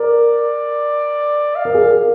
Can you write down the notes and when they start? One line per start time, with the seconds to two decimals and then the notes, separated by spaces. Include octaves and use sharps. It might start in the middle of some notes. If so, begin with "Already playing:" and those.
Already playing: A#4 D5
1.56 F5
1.65 A#4
1.74 G#4
1.84 A#4